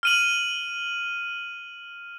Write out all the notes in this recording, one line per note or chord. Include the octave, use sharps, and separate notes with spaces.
F6 D#7 F#7